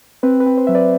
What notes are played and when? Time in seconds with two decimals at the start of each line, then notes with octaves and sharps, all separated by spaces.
0.23 C4 B4
0.40 B4
0.46 C4
0.57 C5
0.67 F#3 E5
0.75 B4 D5